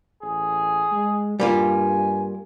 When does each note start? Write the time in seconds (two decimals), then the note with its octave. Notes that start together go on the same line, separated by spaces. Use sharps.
0.22 A1 G#4
0.92 G#3
1.40 G2 G3 A#3 F4 G#5